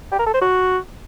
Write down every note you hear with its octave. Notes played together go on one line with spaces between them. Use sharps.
G4
A#4
A4
C5
F#4